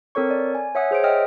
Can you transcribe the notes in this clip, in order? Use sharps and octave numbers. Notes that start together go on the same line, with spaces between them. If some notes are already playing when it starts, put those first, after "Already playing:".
C4 A4 A#4 C#5 C#6
D5
G#5
C#5 E5 F#5 D#6
G#4 C5 C#5 D7
D#5 E5 G5 D#6 F6